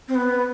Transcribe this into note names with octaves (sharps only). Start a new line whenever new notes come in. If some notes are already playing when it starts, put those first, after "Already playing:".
C4
B3